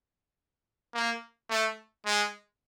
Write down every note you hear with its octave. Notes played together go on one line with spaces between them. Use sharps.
A#3
A3
G#3